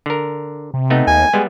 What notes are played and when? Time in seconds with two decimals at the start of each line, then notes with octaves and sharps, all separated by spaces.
0.06 D3 A#4
0.74 C3
0.90 A3 B3 C4 D#4
1.07 D#2 G#5
1.34 G3 G#3 B3